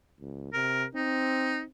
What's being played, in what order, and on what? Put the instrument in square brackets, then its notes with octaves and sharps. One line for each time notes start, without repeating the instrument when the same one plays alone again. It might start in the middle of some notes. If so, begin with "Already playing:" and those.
[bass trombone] C#2
[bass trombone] C3 [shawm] A#4
[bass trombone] C4 [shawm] D#4